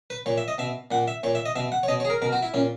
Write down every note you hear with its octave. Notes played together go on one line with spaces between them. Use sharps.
B4
A#2 C#5
E5
D#5
B2 E5
A#2 F#5
E5
A#2 C#5
E5
D#5
B2 E5
F#5
C#5
B2 D#5
C#5
G#4
A#4
B2 A#4
F#4
E4
A#2 C#4